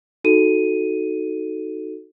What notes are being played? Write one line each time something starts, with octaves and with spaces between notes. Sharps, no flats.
D#4 F#4 A4 D#7